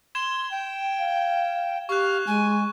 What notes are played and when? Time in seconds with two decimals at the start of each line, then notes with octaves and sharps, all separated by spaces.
0.15 C6 G#6 E7 G7
0.51 G5
0.99 F5
1.89 G4 F5 C#6 F#6
2.27 G#3 G#5